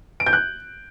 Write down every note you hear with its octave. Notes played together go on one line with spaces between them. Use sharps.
D7
G6
F#6